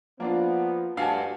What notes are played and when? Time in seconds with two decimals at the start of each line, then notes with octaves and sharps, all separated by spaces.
0.20 F3 A#3 B3 D4 F4
0.97 G2 D4 F#4 F5 G#5 A5